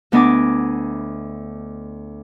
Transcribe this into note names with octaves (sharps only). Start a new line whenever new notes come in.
D2 B3 D4 D#5 G#5 D6